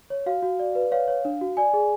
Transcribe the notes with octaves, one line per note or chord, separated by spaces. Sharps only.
C#5
F#4 F5
F#4
D5
B4
C#5 F5
C#5
D4
F#4
D5 G#5
G#4